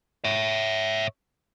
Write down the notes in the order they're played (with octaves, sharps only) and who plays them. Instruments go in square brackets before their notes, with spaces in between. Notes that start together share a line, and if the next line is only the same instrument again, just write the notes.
[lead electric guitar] C#5 E5